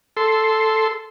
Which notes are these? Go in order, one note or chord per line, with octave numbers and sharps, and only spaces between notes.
A4 C6